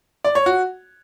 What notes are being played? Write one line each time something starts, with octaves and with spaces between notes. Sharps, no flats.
D5
C#5
F#4